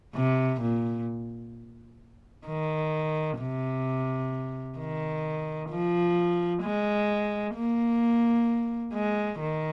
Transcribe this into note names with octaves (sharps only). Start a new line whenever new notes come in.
C3
A#2
D#3
C3
D#3
F3
G#3
A#3
G#3
D#3